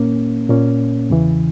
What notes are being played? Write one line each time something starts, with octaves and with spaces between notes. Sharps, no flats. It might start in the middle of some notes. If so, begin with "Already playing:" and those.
Already playing: A#2 A#3 C#4
A#2 A#3 C#4
E2 C#3 E3